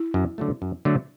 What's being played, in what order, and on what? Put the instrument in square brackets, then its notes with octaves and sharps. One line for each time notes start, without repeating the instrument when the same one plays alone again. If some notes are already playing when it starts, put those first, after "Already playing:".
Already playing: [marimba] E4
[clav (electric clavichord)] F#2
D3 F#3 A3
F#2
D3 F#3 A3